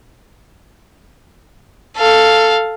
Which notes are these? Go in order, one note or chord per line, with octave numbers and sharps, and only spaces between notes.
A4 F5